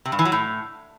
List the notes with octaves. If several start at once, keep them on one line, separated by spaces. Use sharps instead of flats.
C3
G2
E3
F#3
A2